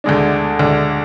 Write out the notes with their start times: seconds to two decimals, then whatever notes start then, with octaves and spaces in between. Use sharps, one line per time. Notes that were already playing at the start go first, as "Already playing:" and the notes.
0.04 D2 D3 G#3 D4
0.59 D2 D3 G#3 D4